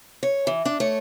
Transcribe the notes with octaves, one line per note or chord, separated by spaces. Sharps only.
C#5
E3
D4
A3 C#5